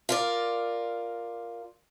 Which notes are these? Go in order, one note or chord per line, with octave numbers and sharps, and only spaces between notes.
F4 A#4 D5